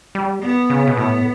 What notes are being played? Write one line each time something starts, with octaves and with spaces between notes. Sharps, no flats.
G3
B3
C#3
B2
A2 B3